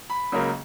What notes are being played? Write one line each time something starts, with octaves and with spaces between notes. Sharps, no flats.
B5
C#2 C#3 F#3 A#3